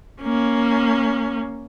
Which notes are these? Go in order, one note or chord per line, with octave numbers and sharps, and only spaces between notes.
A#3 C#4